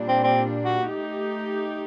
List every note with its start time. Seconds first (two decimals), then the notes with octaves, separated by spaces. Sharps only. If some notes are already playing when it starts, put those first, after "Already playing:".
Already playing: A#2 G3 D4
0.08 C4
0.24 C4
0.65 F#4
0.86 A3 D#4 G4